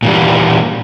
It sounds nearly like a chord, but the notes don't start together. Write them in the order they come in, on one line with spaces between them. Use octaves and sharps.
A#2 E3 G3